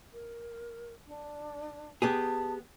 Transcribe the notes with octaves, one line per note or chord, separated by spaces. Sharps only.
A#4
D4
B3 G4 G#4 A5